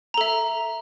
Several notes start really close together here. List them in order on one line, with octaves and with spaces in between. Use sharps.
A#5 A4 E5